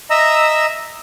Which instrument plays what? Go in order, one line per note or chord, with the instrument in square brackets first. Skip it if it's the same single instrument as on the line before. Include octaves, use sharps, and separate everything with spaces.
[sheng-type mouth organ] D#5 E5 A#5 E6